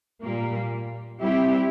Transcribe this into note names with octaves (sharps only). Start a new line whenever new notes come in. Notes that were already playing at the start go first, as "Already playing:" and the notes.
A#2 G3 A#3
G3 C4 E4 G4